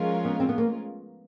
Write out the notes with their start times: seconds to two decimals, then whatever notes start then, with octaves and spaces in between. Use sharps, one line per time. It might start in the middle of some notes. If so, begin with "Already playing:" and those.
Already playing: F3 G#3 C#4 F4 A#4
0.25 B3
0.40 C4
0.49 B3
0.58 A#3